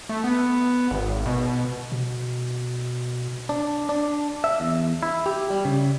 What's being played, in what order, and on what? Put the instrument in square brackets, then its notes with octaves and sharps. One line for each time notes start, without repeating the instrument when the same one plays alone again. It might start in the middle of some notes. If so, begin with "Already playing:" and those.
[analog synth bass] A3
B3
G#1
B2
[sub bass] B2
[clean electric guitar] D4
D4
E5
E2
E4
G4
G3
C#3